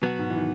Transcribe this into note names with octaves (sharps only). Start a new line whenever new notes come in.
B2 F#3 B3 F#4
G#2
E3
D#3